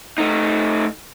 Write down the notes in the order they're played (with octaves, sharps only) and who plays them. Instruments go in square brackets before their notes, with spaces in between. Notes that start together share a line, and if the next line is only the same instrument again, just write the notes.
[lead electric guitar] A3 D#4